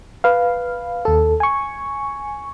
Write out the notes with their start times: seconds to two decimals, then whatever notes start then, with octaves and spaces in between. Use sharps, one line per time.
0.24 B4 F5
1.05 D#2 A4
1.40 G#5 C#6